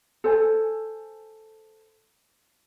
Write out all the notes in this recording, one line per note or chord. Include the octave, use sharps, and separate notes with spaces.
A4 C5 G#5